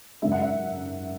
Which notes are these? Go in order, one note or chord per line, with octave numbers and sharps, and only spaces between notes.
F#2 C#3 G#3 E5
F#5
E5